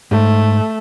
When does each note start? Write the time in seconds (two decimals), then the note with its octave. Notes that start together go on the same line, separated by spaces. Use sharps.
0.11 G#2 A3